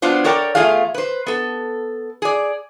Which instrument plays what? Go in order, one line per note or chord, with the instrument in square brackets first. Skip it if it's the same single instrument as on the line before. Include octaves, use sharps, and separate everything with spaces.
[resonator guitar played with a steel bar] F#3 B3 D4 F4 C5
A4 A#4 C#5 D5 G5
E2 D3 A3 F4 G#4 F5
B4 C5
B3 A4
G#4 D5